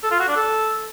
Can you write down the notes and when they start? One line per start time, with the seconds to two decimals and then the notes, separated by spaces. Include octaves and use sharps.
0.03 A4
0.11 F4
0.20 F#4
0.28 D4
0.36 A4